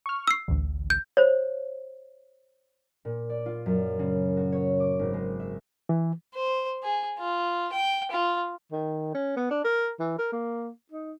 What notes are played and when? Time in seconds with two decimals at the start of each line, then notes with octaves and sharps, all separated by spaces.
0.06 C#6 F6
0.27 E6 C7
0.48 A1 D2
0.90 G6
1.17 C5 C#5
3.05 A#2
3.30 D5
3.46 F4
3.66 F#2
3.99 C#3
4.37 F#4
4.52 C#5
4.80 D6
4.99 G#1
5.14 G#3
5.40 E5
5.89 E3
6.34 C5
6.83 G#4
7.19 F4
7.73 G5
8.11 F4
8.72 D#3
9.14 C#4
9.37 B3
9.51 D4
9.64 A#4
10.00 E3
10.18 A#4
10.33 A#3
10.92 D#4